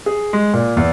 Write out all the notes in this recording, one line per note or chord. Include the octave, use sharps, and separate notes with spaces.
G#4
G#3
A#2
E2